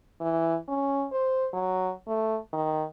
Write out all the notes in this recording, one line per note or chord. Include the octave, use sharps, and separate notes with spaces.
E3
C#4
C5
F#3
A3
D#3